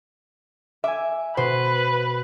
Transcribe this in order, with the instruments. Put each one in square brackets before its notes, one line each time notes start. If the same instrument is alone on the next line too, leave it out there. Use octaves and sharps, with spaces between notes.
[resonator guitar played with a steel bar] E5 [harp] G#5 D6
[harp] B2 [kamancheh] B4 [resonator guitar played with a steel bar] C5